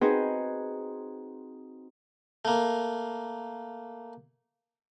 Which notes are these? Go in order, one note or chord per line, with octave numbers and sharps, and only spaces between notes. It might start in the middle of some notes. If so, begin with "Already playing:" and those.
C4 D#4 F#4 G#4 B4 C5
A3 A#3